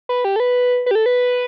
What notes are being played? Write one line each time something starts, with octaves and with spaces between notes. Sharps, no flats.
B4
G4
A4
B4
B4
G4
A4
B4